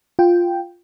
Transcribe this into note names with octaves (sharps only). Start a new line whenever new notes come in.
F4 G5